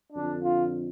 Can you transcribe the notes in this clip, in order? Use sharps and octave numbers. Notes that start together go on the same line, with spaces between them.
F2 D3 D4
F4